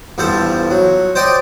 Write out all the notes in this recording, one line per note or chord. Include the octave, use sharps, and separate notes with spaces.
E2 G2 F3 A4 C5
F#3
C5 D5 D#5 G5 C6 D6